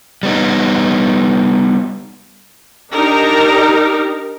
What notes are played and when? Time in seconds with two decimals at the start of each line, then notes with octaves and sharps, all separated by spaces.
0.23 G3 B3 D#4
2.93 D4 D#4 G4 A#4